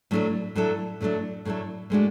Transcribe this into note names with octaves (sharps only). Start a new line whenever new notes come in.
A2 F#3 A3 D4 A4
A2 F#3 A3 D4 A4
A2 F#3 A3 D4 A4
A2 F#3 A3 D4 A4
A2 G#3 D4 F#4